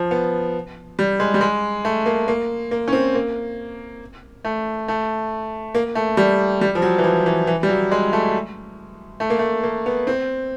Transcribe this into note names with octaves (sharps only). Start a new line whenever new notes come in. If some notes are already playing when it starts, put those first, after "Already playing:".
Already playing: F3
B3
G3
G#3
G3
G#3
A3
A#3
A#3
A#3
C#4
C4
A#3
A3
A3
A#3
A3
G3
G3
F3
F#3
E3
F3
E3
E3
G3
F#3
G#3
A3
A3
A#3
A3
A#3
B3
C4